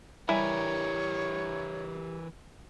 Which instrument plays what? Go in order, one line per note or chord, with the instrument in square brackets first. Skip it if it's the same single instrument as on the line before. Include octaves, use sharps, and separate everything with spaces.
[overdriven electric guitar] E3 A#4 [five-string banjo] G3 [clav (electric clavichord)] E4 G#5 [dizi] C#5